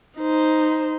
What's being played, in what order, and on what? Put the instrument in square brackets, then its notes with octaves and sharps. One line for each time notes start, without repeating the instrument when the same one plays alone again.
[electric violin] D#4 C5